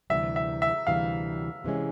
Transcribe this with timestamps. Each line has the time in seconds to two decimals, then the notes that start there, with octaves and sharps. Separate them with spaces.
0.10 D2 C3 E3 G3 E5
0.36 E5
0.62 E5
0.87 D2 C3 E3 G3 F5
1.64 C3 E3 G#3 C#4